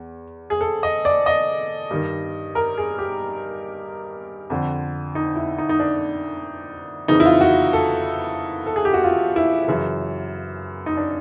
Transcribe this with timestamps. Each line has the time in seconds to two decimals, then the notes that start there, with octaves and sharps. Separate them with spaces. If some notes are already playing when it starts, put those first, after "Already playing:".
Already playing: E2
0.50 G#4
0.61 A4
0.83 D#5
1.05 D5
1.26 D#5
1.91 G2 D#3
2.55 A#4
2.78 G#4
2.98 G4
4.50 F2 D3
5.15 D#4
5.36 E4
5.58 D#4
5.69 D#4
5.80 D4
7.08 F2 C#3 E3 D#4
7.20 E4
7.26 F4
7.41 F#4
7.73 A4
8.66 A4
8.76 G#4
8.85 G4
8.94 F#4
9.04 F4
9.36 E4
9.68 F#2 C#3 E3
10.86 D#4
10.97 D4